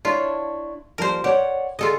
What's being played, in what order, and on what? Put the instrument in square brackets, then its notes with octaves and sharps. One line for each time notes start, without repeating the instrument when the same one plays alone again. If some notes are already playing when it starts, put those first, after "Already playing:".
[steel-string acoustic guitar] D4 E4 C#5 [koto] F4
[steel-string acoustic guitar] D#2 F3 G3 [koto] A#4 C5
[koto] G4 [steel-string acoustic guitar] C#5 D5 F#5
[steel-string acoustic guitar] D3 G#4 [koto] F4 A4 D#5